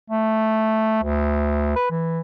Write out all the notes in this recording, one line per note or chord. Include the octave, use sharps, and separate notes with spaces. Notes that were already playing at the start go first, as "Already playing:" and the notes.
A3
D2
B4
E3